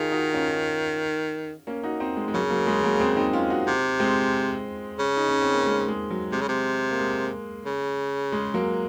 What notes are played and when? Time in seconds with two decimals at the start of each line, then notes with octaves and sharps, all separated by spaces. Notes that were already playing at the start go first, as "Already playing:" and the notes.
Already playing: D#3 F4 G#4
0.12 D#4 F#4
0.33 C#4 F4
1.67 A#3 C#4
1.84 D#4 F#4
2.00 C4 D#4
2.17 G#3
2.28 G#3
2.34 C#3 F#3 A#3
2.50 F#3 A#3
2.67 G#3
2.83 F#3 A#3
3.00 G#3 C4
3.16 C4 D#4
3.33 C#4 F4
3.50 D#4 F#4
3.67 C3
4.00 G#3 C4
4.99 C#3
5.17 D#4
5.29 C#4
5.41 C4
5.53 A#3
5.66 G#3
5.88 G#3
6.11 F#3
6.32 C3 G#3
6.41 C#3
6.49 C3
6.91 A#3
6.99 G#3
7.66 C#3
8.32 G#3
8.54 F#3 A#3